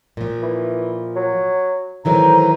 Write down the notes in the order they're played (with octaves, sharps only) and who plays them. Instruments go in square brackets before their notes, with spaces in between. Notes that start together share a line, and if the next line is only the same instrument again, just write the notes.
[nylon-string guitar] A#2 F3
[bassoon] E3
F#3
[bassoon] A2 [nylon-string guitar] D#3 E3 F#3 [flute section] C5 A#5